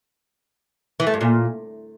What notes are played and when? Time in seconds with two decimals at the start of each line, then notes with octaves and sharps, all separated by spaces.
1.00 E3
1.07 A3
1.14 G2
1.21 A#2